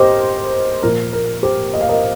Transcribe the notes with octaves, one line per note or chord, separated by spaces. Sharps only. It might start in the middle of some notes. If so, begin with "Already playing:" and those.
Already playing: G4 A#4 C5 D#5
A#2 F3 A#3 A#4
A#4
G4 C5
D#5
F5
A#4 D#5